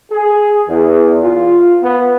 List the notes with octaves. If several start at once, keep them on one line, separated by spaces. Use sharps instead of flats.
G#4
E2
F4
B3